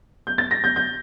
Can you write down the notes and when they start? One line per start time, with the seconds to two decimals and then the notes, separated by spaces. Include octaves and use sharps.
0.27 G6
0.38 A6
0.51 A#6
0.64 G6
0.76 G6